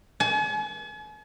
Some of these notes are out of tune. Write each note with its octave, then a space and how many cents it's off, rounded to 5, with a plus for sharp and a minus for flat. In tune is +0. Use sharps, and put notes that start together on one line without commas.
G#5 +45